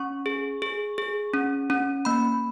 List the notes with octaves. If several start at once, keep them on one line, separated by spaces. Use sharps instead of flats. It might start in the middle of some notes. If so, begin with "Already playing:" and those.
Already playing: C#4 C#6
G#4
G#4
G#4
C#4
C#4
A#3 B5